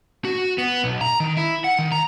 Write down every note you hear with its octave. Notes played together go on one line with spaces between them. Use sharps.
F#4
B3
B1
A#5
D#3
E4
F#5
D#3
A#5